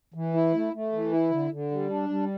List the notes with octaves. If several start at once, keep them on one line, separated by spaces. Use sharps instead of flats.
E3
E4
A3
A3
E3
E4
D3
D3
G3
D4
G3